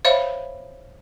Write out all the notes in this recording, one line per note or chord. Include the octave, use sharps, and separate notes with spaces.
C5 C#5 E5 F5 B5